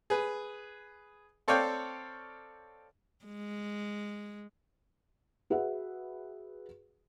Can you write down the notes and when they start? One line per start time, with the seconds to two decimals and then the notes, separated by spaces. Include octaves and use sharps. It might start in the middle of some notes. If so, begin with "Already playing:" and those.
0.10 G#4 B4
1.48 C4 A4 C#5 D5 F5 G5
3.26 G#3
5.50 F#4 G#4 B4 E5 F#5